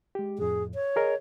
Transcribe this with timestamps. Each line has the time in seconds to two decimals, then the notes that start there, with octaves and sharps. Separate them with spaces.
0.15 G#3 G4
0.38 F2 A2 G#4
0.75 C#5
0.96 G#4 A#4 D#5